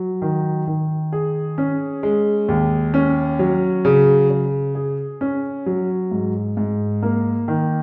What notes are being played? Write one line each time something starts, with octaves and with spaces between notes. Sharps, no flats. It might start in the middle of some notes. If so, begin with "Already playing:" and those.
Already playing: F#3
D#3
D#3
G#4
C#4
G#3
D#2
C#4
F#3
C#3
C#3
G#4
C#4
F#3
G#2
G#2
A#3
D#3